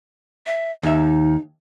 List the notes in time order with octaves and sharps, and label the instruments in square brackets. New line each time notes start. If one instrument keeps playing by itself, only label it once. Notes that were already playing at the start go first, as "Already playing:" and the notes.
[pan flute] E5
[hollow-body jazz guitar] D#2 E5 [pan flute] D#4